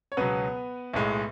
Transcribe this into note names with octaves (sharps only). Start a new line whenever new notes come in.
C#5
C#2 B2 F#3 B3 B4
B1 A2 G#3